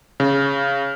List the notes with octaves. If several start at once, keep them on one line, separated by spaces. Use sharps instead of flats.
C#3